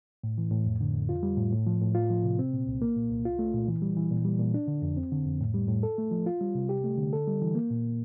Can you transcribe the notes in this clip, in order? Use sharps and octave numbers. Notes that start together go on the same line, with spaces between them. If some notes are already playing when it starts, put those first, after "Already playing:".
A2
E3
A2
F2
D3
F2
F4
G3
A2
A2
F3
A2
F4
F3
C3
C4
A#2
C2
A#3
A#2
C2
F4
A3
A#2
E3
G3
E3
A#2
G3
A#2
D4
D3
F2
C4
D3
F2
A2
G3
A2
A4
A3
F3
F4
G3
C3
G4
A3
D3
A4
G3
E3
A#3
A#2